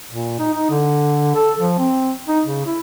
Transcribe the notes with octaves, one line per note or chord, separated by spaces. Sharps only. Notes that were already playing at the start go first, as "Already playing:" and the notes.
A#2
D#4
D#4
D3
A4
F3
C4
D#4
C#3
E4